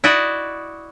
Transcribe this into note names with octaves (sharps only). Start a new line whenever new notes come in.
E4 F#4 D5 D#5